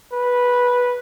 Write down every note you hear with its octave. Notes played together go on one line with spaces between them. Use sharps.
B4